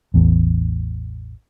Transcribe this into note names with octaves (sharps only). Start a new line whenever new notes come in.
A1 E2